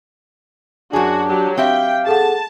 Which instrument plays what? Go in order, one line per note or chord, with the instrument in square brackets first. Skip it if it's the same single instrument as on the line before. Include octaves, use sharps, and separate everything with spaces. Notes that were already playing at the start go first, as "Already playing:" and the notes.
[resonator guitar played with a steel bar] F#2 G#4 [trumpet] D4 [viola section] F#4
[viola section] F#3 G4
[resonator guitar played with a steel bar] C4 G4 E5 [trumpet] F5 [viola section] G5
[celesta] G#4 A4 F#5 [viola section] A5